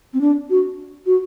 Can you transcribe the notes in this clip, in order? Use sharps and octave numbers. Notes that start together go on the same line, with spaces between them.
C4
D4
F#4
F#4